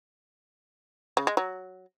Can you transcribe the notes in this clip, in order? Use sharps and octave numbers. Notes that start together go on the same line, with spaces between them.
C#3
G#3
F#3